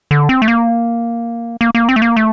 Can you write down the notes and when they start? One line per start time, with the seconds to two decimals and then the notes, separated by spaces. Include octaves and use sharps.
0.11 D3
0.29 C4
0.42 A3
0.48 A#3
1.61 A#3
1.75 A#3
1.89 C4
1.96 A3
2.02 A#3
2.16 A3